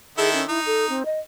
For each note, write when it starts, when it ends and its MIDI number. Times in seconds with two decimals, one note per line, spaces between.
0.18 0.43 51
0.18 0.43 64
0.18 0.32 68
0.18 0.43 69
0.34 0.48 61
0.49 0.98 63
0.49 0.60 64
0.66 0.88 69
0.89 1.03 60
1.05 1.20 75